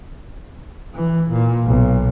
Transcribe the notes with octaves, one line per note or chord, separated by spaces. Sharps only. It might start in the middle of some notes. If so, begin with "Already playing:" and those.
E3
A#2
B1